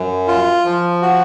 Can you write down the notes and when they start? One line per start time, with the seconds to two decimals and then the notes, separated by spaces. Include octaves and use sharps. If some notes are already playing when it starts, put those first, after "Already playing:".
Already playing: F#2
0.28 F4
0.65 F3
1.02 F#4